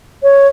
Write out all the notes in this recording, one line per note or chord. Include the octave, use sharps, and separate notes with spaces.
C#5